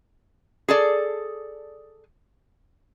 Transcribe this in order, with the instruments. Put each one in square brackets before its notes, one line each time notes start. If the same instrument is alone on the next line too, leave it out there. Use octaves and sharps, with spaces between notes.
[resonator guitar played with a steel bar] G#4 A4 D5